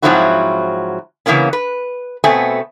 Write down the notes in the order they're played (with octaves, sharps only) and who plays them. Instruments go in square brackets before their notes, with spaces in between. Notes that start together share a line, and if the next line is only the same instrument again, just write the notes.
[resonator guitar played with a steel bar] G#2 F3 F#3 C4 E4 F#4
C#3 E3 A#3 B3 C#4
B4
B2 A3 B3 C4 G#5